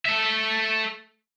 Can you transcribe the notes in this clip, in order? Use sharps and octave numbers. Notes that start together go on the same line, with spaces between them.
A3 E5